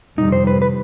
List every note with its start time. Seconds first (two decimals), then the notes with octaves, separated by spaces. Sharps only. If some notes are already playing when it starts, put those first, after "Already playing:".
0.18 F2 C3 D#3 G3 D#4
0.32 C5
0.47 B4
0.62 B4